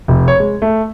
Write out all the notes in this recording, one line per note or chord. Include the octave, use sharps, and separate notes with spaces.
F1
C#5
G#3
A3